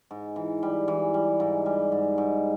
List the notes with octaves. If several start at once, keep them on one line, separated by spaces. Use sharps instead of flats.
G#2
E3
G3
E3
G3
G#2
G3
G#2
G#2